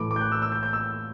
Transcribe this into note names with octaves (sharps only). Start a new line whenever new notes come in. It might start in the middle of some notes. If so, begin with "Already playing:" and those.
Already playing: A2 E3 A3 D6
D6
G6
F#6
E6
E6
G6
G6
E6